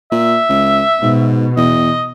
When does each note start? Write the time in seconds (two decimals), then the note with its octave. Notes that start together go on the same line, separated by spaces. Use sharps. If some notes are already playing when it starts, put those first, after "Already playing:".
0.12 A#2 E5
0.49 C#2
1.02 G#2 B2
1.57 E2 D#5